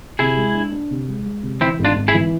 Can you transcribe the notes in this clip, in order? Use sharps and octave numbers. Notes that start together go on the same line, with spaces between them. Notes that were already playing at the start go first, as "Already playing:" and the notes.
C3 E4 G#4
G#3
D4
D4
C3
G#3
G#3
C3
E3 C4 E4
G#1
D4 F4
G#1
E4 G#4
E3